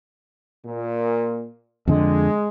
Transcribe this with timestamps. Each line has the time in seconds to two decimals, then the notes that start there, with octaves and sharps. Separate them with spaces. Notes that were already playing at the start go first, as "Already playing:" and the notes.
0.66 A#2
1.88 F2 D3 G#3